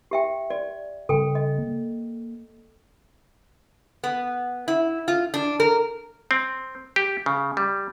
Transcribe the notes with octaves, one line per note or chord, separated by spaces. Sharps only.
G4 E5 G5
D5
C#3 G3 C4 A4 G5
D#5
A#3
B3
E4
F4
D4
A#4
C4
G4
C#3
G3